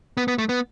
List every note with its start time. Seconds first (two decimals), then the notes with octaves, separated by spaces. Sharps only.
0.17 B3
0.28 B3
0.38 A3
0.49 B3